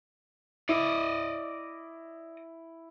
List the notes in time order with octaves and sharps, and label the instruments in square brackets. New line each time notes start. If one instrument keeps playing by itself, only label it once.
[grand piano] E4 [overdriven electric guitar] D5 D#5